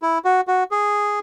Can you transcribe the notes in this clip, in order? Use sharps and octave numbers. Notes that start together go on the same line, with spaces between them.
E4
F#4
F#4
G#4